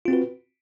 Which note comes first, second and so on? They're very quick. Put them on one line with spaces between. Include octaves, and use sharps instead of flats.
F4 C4 F#4 B4